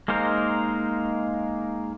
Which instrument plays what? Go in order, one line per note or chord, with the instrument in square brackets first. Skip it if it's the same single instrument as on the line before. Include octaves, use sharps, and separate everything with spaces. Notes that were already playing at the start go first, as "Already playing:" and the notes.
[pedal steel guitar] G#3 A#3 D#4 A#4 C5